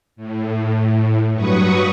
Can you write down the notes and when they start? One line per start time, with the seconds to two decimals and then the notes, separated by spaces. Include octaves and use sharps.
0.16 A2
1.33 G2 F#3 B4 C#6 D#6